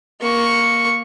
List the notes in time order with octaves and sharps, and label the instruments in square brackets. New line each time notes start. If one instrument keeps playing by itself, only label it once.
[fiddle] A#3 C#6